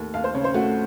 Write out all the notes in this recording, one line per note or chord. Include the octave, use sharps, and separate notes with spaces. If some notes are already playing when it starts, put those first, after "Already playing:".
Already playing: D#2 A3
D#2 F5
C5
C#3 C#5
C5
A3 F#4